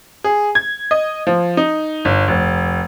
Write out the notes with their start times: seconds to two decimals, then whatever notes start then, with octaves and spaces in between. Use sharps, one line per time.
0.24 G#4
0.55 G#6
0.91 D#5
1.27 F3
1.57 D#4
2.05 G1
2.28 F1